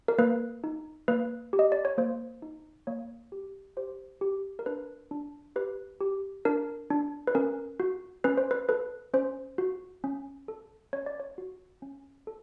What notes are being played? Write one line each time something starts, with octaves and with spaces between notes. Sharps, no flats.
A#4
A#3 B4
D#4
A#3 B4
G4
D#5
D5
C#5
A#3 C5
D#4
A#3 C#5
G4
G4 C5
G4
A#4
D4 B4
D4
G4 B4
G4
D4 A#4
D4
B4
C#4 A#4
F#4
C#4 B4
C5
B4
A4 B4
C#4 C5
F#4
C#4
A4
C#4 C#5
D5
C#5
F#4
C#4
A4